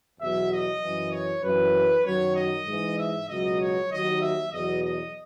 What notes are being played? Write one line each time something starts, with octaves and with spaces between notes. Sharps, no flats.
E2 B2 F#3 E5
D#5
F#2 E3
C#5
F#2 E3 B4
F#2 D#3 F#3 C#5
D#5
G#2 E3
E5
C#2 B2 F#3 D#5
C#5
D#2 D#3 F#3 D#5
E5
E2 B2 F#3 D#5
D#5